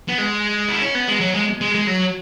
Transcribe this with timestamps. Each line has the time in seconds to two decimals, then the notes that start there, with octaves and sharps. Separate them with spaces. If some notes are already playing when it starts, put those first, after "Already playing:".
0.09 B3
0.18 G#3
0.68 E4
0.81 C#4
0.95 B3
1.08 G#3
1.20 F#3
1.34 G#3
1.61 G#3
1.74 G#3
1.87 F#3